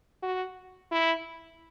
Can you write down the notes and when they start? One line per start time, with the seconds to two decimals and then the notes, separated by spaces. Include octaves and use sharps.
0.22 F#4
0.92 E4